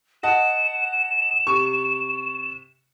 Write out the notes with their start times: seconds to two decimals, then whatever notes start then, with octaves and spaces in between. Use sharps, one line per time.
0.23 D#5 F#5 A5 E7
1.47 C3 C#6